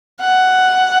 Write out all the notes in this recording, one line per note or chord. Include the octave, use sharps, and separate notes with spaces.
F#5